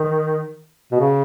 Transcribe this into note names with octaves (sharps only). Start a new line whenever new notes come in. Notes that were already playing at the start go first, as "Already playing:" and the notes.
Already playing: D#3
B2
C#3